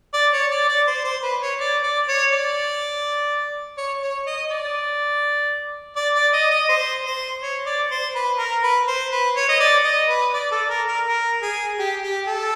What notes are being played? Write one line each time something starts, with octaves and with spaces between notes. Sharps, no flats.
D5
C#5
D5
D5
C5
C5
B4
C#5
D5
D5
C#5
D5
C#5
C#5
D#5
D5
D5
D5
D#5
D#5
C5
C5
C#5
D5
C5
B4
A#4
B4
C5
B4
C#5
D#5
D5
D#5
B4
D5
A4
A#4
A#4
A#4
G#4
G4
G4
A4